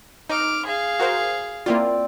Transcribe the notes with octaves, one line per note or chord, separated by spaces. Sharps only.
D#4 D6 F6
G#4 F5
F#4 A#4 C5
A#3 C4 E4 F4 D5